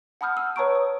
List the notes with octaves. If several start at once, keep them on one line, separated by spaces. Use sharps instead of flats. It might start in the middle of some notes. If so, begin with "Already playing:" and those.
F#5 A5 B5 D#6 F6 G6
E6
B4 C#5 A5 A#5 C#6 D7
D#6